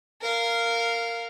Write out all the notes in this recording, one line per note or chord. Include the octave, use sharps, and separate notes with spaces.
A#4 F5